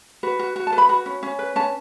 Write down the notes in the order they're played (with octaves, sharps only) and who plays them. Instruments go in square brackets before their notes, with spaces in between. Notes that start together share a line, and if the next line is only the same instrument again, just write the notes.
[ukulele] F#4 B4
F#4
F#4
A5
B4
B5
F#4 B5
C#4
C#4
B4
C#4 A5